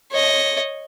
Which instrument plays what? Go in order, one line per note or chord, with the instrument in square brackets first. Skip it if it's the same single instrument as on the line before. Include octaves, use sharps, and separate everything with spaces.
[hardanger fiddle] C#5 D#5